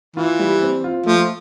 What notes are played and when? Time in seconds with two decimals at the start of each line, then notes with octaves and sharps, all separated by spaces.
0.16 E3 F4
0.39 G3
0.62 C4
0.84 F4
1.06 F3 A3